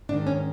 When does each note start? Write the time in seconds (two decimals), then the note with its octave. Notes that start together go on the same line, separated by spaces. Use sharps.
0.09 G#2 D4
0.13 D#3
0.27 C#4